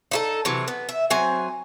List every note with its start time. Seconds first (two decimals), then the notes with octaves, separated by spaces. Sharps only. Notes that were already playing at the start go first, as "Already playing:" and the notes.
0.11 D#4 E4 A4
0.45 C3 E3 F#3
0.68 B3
0.89 E5
1.10 F#3 C4 G#5